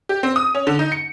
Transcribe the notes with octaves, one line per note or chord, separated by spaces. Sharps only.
G4
C4
D#6
C#4
D3
D#4
C#7